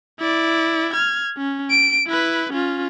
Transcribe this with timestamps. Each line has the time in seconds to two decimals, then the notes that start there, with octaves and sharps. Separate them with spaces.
0.20 E4 D5
0.94 F6 G#6
1.38 C#4
1.70 D7
2.07 E4 B4
2.52 C#4 F4